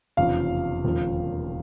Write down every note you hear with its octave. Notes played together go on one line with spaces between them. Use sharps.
F1 E2 C#3 F3 F5
E1 D#2 C#3 F3